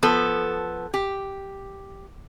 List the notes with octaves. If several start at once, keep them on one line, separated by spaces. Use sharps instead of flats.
F3 B3 A4
G4